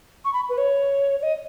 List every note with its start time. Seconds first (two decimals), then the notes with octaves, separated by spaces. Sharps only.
0.25 C#6
0.33 B5
0.49 B4
0.58 C#5
1.20 C#5
1.23 D#5